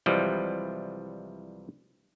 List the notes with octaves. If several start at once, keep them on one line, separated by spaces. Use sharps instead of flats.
C2 E3 F3 G3 G#3